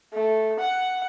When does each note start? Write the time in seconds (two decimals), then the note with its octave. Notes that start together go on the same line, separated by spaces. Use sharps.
0.13 A3
0.59 F#5